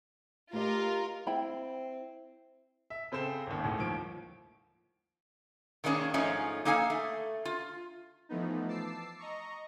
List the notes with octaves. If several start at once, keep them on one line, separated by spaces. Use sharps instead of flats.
A3 F4 G4 A#4 D#5
C4 E4 G5 B5
E5
C#3 C4 A4 C5 E7
G#1 D#2
E1 A1 A2
D#2 F3 D7
D#3 G#3 A#3 C#4 D4
G#2 F3 A3 C#4 D#4
A#3 D#4 A4 F5 G#5
A3
F4
E3 F3 A3 B3 D#4
A5 D6 E6 C7
D#5 A#5 C#6